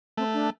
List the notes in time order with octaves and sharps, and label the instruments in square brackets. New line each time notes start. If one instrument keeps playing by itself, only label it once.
[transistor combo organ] A3 [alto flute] C4
[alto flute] D4